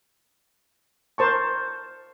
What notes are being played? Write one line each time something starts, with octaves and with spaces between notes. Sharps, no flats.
A#4 C5 A5 C#6